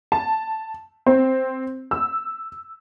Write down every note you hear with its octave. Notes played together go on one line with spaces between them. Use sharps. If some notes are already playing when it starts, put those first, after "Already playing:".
A5
C4
E6